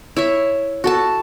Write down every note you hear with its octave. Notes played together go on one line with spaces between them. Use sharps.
E4 C#5 E5
F#4 A4 A5